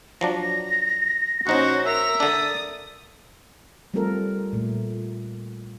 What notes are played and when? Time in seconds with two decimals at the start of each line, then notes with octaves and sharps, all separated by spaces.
0.21 F3 F#3 D4 A#6
1.47 A#1 C#4 D#4 F#4 C5 F#5
1.86 A#4 E5 F7
2.20 D3 D4 D#6 A6
3.94 G3 A3 C4 F4 A4 A#4
4.53 A#2 A3